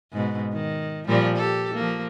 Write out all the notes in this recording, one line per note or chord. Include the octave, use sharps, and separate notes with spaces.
G#2 B2
D#3
A#2 F3 G3
G4 A4
F3 A#3